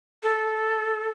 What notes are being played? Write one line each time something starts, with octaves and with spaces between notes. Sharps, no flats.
A4